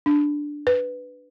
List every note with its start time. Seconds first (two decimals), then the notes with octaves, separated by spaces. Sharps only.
0.06 D4
0.67 B4